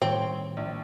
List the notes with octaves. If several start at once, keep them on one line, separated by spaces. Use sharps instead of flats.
A2 D#3 G3 C4 C#5
A#1